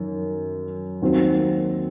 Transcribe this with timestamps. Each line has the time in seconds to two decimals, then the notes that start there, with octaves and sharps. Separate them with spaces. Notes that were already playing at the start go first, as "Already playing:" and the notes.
Already playing: F#2 D#3
1.02 D#2 D#3 F#3 C4